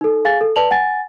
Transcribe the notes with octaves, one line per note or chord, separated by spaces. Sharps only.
D#4 A4
G#4 F5 G#5 A6
A4
B4 D5 A5 F7 F#7
F#5 G#5 A6